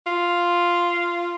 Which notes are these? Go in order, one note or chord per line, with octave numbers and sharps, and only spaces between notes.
F4